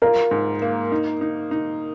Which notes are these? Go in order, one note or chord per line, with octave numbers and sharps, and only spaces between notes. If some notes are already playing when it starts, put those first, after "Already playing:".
F4 A#4
G#2
A#3
D#4
D#4
D#4